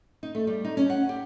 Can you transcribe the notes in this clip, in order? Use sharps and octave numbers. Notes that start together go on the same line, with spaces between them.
D#4
A3
G3
D#4
C#4
F#5
G4